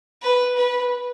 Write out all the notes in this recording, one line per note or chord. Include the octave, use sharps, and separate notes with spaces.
B4
B4